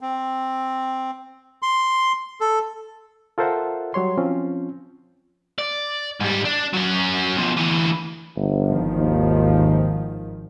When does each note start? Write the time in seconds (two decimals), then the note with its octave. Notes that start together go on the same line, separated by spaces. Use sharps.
0.01 C4
1.62 C6
2.41 A4
3.38 F4 A4 A#4 C5 E5 F#5
3.94 F#3 G3 C#5 C6
4.18 F3 C4 C#4 F4
5.58 D5
6.20 G#2 G3
6.45 D4
6.74 F#3 C#4
7.37 B2 F3
7.57 D2 E3
8.36 G1
8.66 G#1 D#3 F3
8.97 D#2